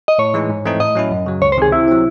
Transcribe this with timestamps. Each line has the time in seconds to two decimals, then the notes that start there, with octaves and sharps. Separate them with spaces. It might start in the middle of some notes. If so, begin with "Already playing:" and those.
0.08 D#5
0.19 A2 C#5
0.34 E3 G#3 D#4
0.49 G#2
0.65 E3 A3 C4 D#4
0.80 A2 D#5
0.95 F#3 C#4 E4
1.11 F#2
1.26 C#3 F#3
1.42 C#2 C#5
1.52 C5
1.58 C3 D#3 G#4
1.72 C3 E4
1.88 F#3 C4